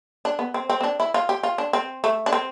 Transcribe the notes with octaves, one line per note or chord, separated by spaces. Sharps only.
D4
B3
C4
C4
C4
D4
E4
F4
G4
F4
D4
C4
A3
D4
C4